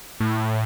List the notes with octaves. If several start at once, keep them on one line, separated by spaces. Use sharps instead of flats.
A2